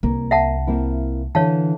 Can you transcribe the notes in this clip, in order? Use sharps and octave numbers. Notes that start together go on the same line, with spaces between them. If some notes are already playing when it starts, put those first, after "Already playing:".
C2 A#3
E5 F#5 A5
A#3 C4 E4
D3 E3 C#5 F5 A5